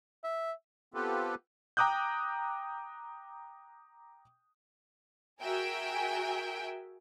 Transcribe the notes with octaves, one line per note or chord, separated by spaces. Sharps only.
E5
B3 C4 F4 G4 A4 B4
G5 A#5 D6 D#6 F#6 G6
F#4 G#4 A#4 E5 G5 G#5